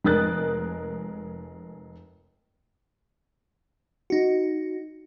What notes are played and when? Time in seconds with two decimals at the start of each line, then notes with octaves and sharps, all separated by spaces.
0.04 F1 G#3 A#4 D#6 F#6 A6
4.10 D#4 F#4